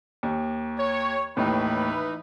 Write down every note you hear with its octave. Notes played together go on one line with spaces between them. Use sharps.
D#2
C#5
D#2 A2 E3 D#4 B4